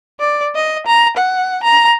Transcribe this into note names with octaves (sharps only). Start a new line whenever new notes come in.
D5
D#5
A#5
F#5
A#5